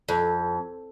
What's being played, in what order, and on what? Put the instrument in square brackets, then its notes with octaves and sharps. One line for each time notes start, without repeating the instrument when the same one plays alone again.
[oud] F2